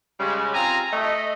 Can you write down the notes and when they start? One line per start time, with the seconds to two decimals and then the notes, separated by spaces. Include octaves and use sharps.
0.19 C#3 G3 G#3
0.54 C4 F4 G#5 A#5
0.92 A3 D#5